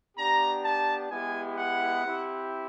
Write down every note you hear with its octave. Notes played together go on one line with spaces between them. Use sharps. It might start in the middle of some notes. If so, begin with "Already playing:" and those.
B3 D4 G4 A#5
A5
G#3 B3 E4 G4 G#5
F#5
C4 E4 G4